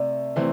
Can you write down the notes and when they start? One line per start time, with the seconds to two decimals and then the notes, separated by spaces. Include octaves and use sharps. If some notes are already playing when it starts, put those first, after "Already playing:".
Already playing: C3 A3 D5
0.36 C3 E3 A3 C4